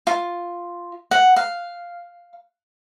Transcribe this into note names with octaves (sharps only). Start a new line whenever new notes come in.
F4
F#5
F5